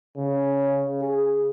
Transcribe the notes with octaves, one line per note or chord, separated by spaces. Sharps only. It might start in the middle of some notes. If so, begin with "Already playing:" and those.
C#3
G#4